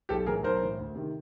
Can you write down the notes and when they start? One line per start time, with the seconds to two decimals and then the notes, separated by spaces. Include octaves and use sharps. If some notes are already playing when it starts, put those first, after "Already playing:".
0.09 B1 G4 A4
0.26 A2 E3 G#4 A#4
0.43 B1 A#4 C5
0.62 A2 E3
0.79 D2
0.95 C3 D#3